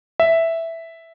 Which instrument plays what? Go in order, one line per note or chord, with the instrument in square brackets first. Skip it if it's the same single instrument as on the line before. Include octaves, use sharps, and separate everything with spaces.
[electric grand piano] E5